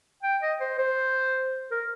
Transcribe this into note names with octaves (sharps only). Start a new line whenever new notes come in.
G5
D#5
C5
C5
A#4